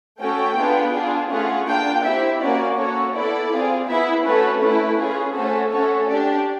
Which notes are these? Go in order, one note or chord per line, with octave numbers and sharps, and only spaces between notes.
A3 C#4 F#4 A4 G5
B3 D4 F4 G#4
D4 F4 G#4
A3 C#4 F4 G#4 F#5
A#3 D4 F4 G5
C4 E4 G4 E5
A#3 C#4 F#4 D5
C#4 F#4 A4 C#5
B3 E4 A4 D5
C4 F4 G#4
B3 E4 G#4 E5
A3 C#4 F#4 A4 B4
A3 C#4 E4 A4 B4
C#4 F4 G#4
A3 C#4 F#4 A4 C5
A3 C#4 F#4 A4 C#5
D4 G4 D5